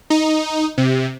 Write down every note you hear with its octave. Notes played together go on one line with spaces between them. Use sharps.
D#4
C3